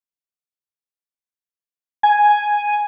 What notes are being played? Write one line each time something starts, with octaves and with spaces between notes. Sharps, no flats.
G#5